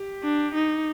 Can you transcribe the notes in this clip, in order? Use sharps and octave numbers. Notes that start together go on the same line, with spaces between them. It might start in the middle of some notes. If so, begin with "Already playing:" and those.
Already playing: G4
D4
D#4